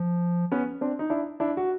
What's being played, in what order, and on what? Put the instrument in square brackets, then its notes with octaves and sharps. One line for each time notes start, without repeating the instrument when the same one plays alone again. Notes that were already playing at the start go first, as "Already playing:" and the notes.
Already playing: [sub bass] F3
[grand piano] B3 C#4
C4 D4
D#4
D4 E4
D4 E4
F#4